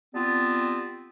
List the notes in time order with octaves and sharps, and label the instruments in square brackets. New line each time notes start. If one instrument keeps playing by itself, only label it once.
[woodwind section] G3 B3 C4 F4 A5